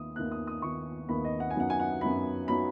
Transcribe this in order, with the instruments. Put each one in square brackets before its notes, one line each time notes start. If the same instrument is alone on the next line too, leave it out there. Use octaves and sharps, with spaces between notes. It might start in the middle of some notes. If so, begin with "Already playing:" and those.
Already playing: [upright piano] D#2 D#3 B3 D#6
D#2 D#3 B3 F#6
D#6
D#6
D#2 D#3 B3 C#6
D#2 D#3 B3 B5
D#5
F#5
G#5
F#2 F#3 B3 D#4 F#5
G#5
F#5
F#2 F#3 B3 D#4 B5
F#3 B3 D#4 B5